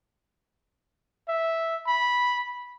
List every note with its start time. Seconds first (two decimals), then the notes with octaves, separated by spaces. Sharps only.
1.28 E5
1.87 B5